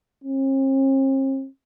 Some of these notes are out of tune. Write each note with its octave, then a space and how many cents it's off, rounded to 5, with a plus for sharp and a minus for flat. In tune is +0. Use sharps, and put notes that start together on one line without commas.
C4 +45